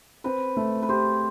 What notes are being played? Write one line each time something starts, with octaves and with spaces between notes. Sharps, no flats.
C4 B4
A3
B4
G4 C5